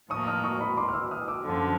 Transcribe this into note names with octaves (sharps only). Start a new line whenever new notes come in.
A2 F3 A#3 C#6 D#6
D#6 F6
C#6 D#6
B5 C#6
C6 D6
F6
D6 E6
D#6 F6
D6 E6
F#2 D3 F3